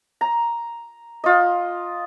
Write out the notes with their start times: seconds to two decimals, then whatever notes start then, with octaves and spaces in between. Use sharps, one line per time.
0.21 A#5
1.24 F4 D#5